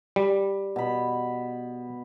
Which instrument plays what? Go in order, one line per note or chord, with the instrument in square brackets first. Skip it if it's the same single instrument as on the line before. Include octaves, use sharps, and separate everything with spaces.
[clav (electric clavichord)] G3
[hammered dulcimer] B2 B5